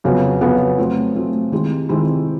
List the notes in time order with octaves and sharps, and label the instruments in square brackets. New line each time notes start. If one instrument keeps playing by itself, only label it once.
[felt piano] F2 C#3 F#3 B3
F2 C#3 F#3 B3
F#3 A3 C4
F#3 A3 C4
D#3 G#3 C4 E4 G4
D#3 G#3 C4 E4 G4